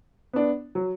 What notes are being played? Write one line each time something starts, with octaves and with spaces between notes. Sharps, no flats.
B3 D4
F#3